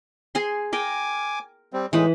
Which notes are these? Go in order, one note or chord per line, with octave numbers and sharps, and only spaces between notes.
G#4 G#5 C6
A#4 G5 G#5 D6
G3 C4
A2 E3 G#3 D#4 B4